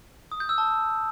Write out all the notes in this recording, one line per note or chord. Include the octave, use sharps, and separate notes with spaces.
D#6
G6
E6
A5